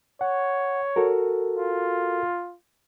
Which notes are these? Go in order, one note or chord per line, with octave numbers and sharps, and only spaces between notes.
C#5 F#5
F#4 A4 A#4
F4